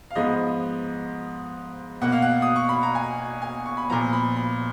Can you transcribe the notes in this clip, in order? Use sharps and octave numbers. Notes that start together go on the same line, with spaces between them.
F5
G#2 F3 G#3 B3 D#5
B2 A#3 F#5
F5
F#5
D#6
C#6
B5
A#5
G#5
G#5
C#6
B5
A#2 F3 B3 A#5
B5
B5